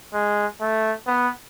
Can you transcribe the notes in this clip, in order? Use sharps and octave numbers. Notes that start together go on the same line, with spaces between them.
G#3
A3
B3